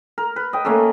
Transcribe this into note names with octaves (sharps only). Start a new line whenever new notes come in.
A#4
B4
D#5 G5
A3 A#3 C#4 A4